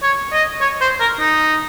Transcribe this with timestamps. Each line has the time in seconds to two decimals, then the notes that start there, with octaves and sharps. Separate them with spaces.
0.03 C#5
0.32 D#5
0.61 C#5
0.81 C5
1.00 A#4
1.19 D#4